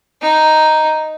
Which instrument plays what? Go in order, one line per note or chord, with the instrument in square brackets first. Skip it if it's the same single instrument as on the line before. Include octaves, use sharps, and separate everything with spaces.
[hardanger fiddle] D#4